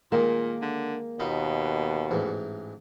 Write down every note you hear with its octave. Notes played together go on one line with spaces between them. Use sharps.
A#2 D#3 G#3 A#3
D3
D#2 B2 D#4 F4 B5
A1 G#2 E3